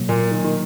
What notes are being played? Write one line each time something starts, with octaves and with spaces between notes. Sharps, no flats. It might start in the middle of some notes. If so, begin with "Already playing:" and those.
Already playing: B2 F#3 A#3
A#2
D#3
D#3